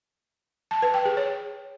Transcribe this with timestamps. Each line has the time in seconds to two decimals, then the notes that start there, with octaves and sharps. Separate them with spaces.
0.71 A5
0.82 B4
0.94 G5
1.05 G#4
1.17 C#5